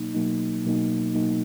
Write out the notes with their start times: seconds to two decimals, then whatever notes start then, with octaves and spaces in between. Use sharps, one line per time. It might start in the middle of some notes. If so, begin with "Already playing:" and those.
Already playing: B2 F#3 A#3 D#4
0.14 B2 F#3 A#3 D#4
0.65 B2 F#3 A#3 D#4
1.15 B2 F#3 A#3 D#4